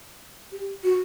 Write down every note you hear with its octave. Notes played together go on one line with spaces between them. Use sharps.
G4
F#4